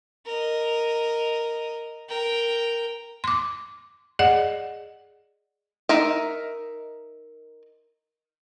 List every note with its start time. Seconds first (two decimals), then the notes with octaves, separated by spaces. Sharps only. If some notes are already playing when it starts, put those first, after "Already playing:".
0.26 A#4 D#5
2.09 A#4 G5
3.24 C6 D6
4.19 G#4 D5 D#5 F#5
5.89 D#4 A#4 E5